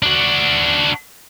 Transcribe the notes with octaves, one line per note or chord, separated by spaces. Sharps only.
D4 F#4